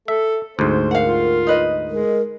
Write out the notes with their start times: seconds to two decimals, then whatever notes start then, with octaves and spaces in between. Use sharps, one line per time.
0.08 A4 E5
0.59 D2 G#2 C5
0.91 A#4 F5 F#5
1.07 F4
1.47 D#4 B4 D#5
1.91 G#3 A#4